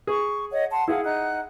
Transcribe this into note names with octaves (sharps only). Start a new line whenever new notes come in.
G#4 C#6
C#5 D#5 F#5
F#5 A5 C6
E4 G#4 F5 F#5
D#4 F#5 F#6